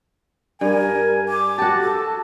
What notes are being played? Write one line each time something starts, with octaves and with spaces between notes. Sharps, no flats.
G2 A#4 G#5
D6
F#4 G4 A5
A4 A5